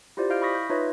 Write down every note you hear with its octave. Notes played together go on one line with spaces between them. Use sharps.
E4 F4 G4 C5 D5
E4 D#5 F5 F6 G6 D7
B5 C#6 D#6 A#6 B6
G6
D#4 F4 B4 C#5 D#5 E5